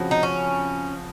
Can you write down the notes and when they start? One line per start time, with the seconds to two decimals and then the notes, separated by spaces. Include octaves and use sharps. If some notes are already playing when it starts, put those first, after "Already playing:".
Already playing: C#3 F3 C4 F#4 C#5
0.11 D#4
0.23 C#4